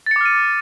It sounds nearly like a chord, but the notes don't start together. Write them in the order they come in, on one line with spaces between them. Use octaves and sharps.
A6 C#7 D6 F6 D#7